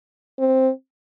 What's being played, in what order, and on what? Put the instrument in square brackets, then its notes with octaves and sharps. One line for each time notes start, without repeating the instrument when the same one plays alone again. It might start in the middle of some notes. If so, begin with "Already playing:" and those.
[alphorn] C4